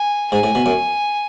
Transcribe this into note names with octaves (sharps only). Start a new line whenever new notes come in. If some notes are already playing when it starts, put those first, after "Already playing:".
Already playing: G#5
G#2 G#5
A2
B2
F#2